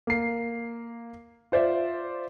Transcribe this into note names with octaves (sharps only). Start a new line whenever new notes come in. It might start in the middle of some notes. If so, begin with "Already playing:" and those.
A#3 C7
F4 C5 D5 E5